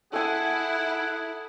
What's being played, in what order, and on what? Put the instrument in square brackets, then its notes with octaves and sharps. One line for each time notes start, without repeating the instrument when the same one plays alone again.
[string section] E4 [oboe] G#4 [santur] A4 G#5 [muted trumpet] F#5